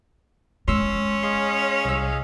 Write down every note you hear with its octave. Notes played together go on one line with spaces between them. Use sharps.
G#3 C#4 C6 E6
G#4 D#5 F5 C6
C2 E6